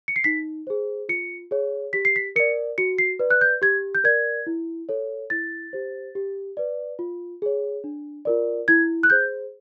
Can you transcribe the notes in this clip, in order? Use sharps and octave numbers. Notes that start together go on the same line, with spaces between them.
C#7
C7
D#4 B6
G#4 C5
F4 C#7
G#4 C#5
G4 B6
C7
B6
A#4 D5 C#7
F#4 C#7
C7
B4 D5
F#6
G6
G4 G#6
G6
A#4 D5 G#6
E4
A4 C#5
E4 A6
G4 C5
G4
B4 D5
F4
G#4 C#5
D4
F4 A#4 D5
E4 G#6
F#6
G#4 C5 G6